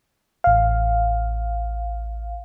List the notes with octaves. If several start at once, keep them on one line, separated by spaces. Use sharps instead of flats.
A1 F5